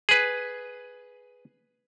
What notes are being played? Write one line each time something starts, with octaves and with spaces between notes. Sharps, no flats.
G#4 B4